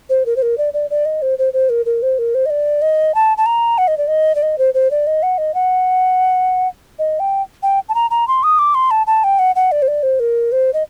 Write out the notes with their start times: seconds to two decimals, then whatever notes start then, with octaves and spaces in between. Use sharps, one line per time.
0.10 C5
0.26 A#4
0.36 C5
0.42 A#4
0.58 D5
0.74 D5
0.90 D5
1.06 D#5
1.22 C5
1.38 C5
1.53 C5
1.70 A#4
1.86 A#4
2.02 C5
2.19 A#4
2.35 C5
2.46 D#5
2.50 D5
2.82 D#5
3.15 A5
3.37 A5
3.46 A#5
3.78 F#5
3.88 D#5
3.98 D5
4.08 D#5
4.35 D5
4.43 D#5
4.58 C5
4.74 C5
4.91 D5
5.07 D#5
5.23 F#5
5.38 D#5
5.54 F#5
6.99 D#5
7.20 G5
7.63 G5
7.89 A5
7.95 A#5
8.11 A#5
8.28 C6
8.43 D#6
8.59 D6
8.75 C6
8.91 A5
9.07 A5
9.24 G5
9.39 F#5
9.56 F#5
9.72 D5
9.82 C5
9.88 D5
10.03 C5
10.20 A#4
10.52 C5
10.74 D#5